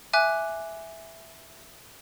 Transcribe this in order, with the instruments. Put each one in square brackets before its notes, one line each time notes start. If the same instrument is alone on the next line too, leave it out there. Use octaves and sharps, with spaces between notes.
[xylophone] E5 G#5 D6 F#6